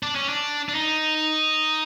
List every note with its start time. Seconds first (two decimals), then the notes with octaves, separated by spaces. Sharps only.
0.03 D4
0.16 C#4
0.29 D4
0.69 D4
0.75 D#4